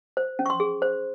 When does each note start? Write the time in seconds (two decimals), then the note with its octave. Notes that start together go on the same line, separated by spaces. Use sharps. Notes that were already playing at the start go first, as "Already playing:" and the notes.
0.17 C5
0.39 C#4
0.46 C#6
0.50 C6
0.60 G#4
0.82 C5